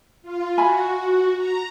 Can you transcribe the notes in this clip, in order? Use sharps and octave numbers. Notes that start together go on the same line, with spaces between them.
F4
F#4 E5 G#5 B5
A#5